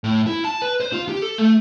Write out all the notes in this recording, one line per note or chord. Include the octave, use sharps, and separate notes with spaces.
A2
E4
A5
B4
C5
F4
G4
A4
A3